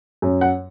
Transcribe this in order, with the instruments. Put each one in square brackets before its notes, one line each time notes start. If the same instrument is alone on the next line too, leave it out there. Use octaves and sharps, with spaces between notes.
[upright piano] F#2
F#5